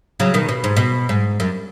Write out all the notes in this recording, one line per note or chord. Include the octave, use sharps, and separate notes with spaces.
C#3 F#3
B2 D#3
B2
G#2
B2
G#2
F#2